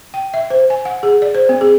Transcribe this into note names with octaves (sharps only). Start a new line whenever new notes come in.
G5
E5
C5
G#5
F#5
G#4
D5
C5
C4
G#4